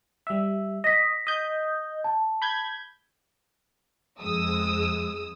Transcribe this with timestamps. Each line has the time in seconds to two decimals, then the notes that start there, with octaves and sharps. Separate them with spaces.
0.27 G3 E5
0.84 D#5 A#6 B6
1.27 D#5 G6
2.04 A5
2.42 B5 G6 G#6
4.22 F2 G#3 D#6 E6